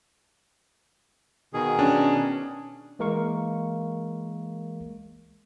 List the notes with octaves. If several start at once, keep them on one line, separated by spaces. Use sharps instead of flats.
B2 D#3 G#4
C#4 D4
E3 G#3 A#3 A#4 F5 C#6